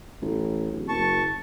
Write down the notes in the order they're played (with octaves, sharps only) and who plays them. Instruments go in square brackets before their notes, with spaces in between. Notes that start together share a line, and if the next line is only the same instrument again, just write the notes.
[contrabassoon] A1
D1
[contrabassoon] F#1 [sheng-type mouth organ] A5 C#6